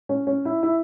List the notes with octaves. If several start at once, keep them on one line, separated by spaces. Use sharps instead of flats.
C#4
C#4
E4
E4